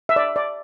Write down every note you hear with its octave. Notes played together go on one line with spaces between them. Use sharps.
E5
D5
D5